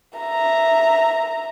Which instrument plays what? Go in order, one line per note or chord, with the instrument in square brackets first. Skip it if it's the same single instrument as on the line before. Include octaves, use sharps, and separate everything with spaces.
[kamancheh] E5 A#5